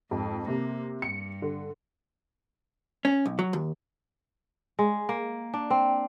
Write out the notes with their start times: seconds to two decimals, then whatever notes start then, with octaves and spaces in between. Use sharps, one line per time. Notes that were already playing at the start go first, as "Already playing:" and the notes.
0.11 F2 G#2
0.48 C3 A#3
1.02 G2 C#7
1.42 D3
3.05 C#4
3.26 B1
3.39 F#3
3.53 D#2
4.79 G#3
5.09 A#3
5.54 D4
5.70 C4